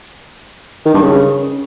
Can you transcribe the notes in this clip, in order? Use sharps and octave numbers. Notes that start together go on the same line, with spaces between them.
D#3
G2
C#3